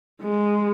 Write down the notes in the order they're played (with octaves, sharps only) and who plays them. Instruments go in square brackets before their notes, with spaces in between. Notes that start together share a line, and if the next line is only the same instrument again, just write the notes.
[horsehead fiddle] G#3